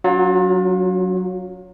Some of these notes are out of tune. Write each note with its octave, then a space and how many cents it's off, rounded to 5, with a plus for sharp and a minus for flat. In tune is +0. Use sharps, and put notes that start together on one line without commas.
F#3 +0 C#4 +45 F4 +35